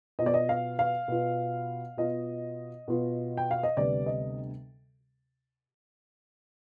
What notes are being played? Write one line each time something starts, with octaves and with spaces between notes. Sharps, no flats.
B2 B3 F4 D#5
D5
D#5
F5
F5
B2 B3 F4
B2 B3 F4 D#5
B2 B3 F4
G5
F5
D#5
D2 C3 G3 B3 D5
D#5